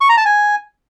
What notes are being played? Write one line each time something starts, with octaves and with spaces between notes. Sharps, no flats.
C#6
A#5
A5
G#5